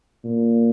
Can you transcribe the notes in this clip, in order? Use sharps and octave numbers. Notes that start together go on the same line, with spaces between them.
A#2